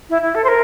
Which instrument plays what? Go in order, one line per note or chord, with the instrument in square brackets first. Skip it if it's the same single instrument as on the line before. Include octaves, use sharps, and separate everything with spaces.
[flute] E4
E4
A4
C5
A#4